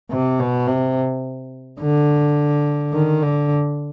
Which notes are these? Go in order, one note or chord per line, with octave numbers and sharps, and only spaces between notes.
C3
B2
C3
D3
D#3
D3